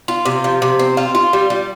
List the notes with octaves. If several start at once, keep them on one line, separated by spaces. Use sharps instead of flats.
F4
C3
F3
C3
C4
F4
F4
G3
G3